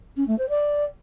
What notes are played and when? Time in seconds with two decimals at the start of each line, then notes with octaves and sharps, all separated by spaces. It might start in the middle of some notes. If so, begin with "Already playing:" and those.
0.16 C#4
0.27 A3
0.38 C5
0.49 D5